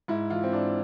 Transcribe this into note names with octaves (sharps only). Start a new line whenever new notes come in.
G#2 E4
E3 F4
C4
G#2 D4